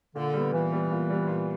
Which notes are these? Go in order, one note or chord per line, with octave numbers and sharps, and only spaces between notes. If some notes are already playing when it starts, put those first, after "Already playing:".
A#2 D3
G3 B3
A#2 E3
G3 B3
A#2
G3 B3
A#2